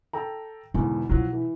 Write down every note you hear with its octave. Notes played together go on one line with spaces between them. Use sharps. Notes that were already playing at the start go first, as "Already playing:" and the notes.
A4 G5 A#5
E2 G#2 B2 D3
B2 F3 F#3 E4
E3